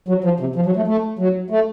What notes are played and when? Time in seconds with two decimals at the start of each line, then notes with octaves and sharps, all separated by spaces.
0.08 F#3
0.24 F3
0.40 C3
0.56 F3
0.66 F#3
0.76 A3
0.87 A3
1.19 F#3
1.50 A3